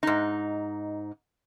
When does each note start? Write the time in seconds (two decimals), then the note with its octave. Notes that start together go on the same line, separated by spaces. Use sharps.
0.03 G#2 D#4